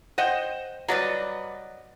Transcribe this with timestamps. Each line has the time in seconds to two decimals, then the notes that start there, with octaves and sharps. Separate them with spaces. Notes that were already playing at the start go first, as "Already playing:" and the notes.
0.18 C5 D#5 F#5 G5
0.88 F#3 G3 B4 D5 D#5